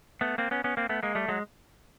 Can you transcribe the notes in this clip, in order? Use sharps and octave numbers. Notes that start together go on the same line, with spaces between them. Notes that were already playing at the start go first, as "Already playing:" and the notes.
A3 B3
A#3 C4
B3 C#4
B3 C#4
A#3 C4
A3 B3
G#3 A#3
G3 A3
F#3 G#3